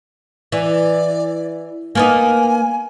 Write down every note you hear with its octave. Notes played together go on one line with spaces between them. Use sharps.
E3 D5
A#3 B3 D#4 G#5